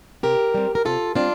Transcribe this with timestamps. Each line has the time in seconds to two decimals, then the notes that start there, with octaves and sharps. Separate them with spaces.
0.23 C3 G4 A#4
0.54 G3 C4
0.75 A#4
0.85 C3 F4 A4
1.15 G3 C4 D4 F4